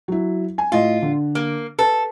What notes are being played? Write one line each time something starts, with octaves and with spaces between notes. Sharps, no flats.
F#3 E4
G#5
A2 F4 D#5
D3
A#3
A4 B4